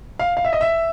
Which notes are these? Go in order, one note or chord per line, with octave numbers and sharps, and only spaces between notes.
F5
F5
E5
D#5
E5